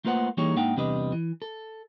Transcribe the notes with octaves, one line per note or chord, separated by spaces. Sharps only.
A3 A#3 F4 B4 C5 F#5
E3 G3 A#3 D#4 G#4 C#5
G#2 A#3 D4 D#4 F#5 G5
E2 C3 G3 D4 B4 D#5
E3
A4